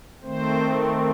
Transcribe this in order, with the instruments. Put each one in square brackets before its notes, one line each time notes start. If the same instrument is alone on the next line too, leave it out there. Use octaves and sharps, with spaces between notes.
[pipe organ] D#3 A3 C4 C5